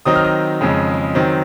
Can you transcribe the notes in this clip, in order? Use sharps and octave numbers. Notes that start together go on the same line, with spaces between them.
D#3 F#3 C4 D#4 D#6
F6
D#6
F2 C#3 G#3
D#3 F#3 C4